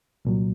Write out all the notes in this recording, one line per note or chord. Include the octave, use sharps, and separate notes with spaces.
C2 A#2 F#3